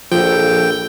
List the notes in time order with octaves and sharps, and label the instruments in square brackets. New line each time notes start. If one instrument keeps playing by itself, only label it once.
[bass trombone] A#1 [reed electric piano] F3 [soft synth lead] A4 [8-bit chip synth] G5